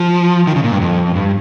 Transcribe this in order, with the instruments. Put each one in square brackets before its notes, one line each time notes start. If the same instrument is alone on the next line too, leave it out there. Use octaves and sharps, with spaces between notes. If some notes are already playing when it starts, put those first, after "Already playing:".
Already playing: [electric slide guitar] F3
D#3
C#3
A#2
G2
F2
G2